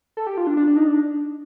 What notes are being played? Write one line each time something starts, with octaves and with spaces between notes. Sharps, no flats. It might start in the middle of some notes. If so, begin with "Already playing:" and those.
A4
G4
F4
D4
D4
D4
D#4
D4